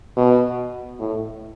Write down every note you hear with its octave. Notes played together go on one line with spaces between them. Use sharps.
B2
A2